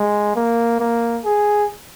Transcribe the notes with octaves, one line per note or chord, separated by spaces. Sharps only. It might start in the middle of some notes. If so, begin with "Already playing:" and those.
Already playing: G#3
A#3
A#3
G#4